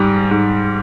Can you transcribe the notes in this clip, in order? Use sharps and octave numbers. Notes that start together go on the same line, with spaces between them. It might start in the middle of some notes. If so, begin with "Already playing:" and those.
Already playing: G#2 G3
G#2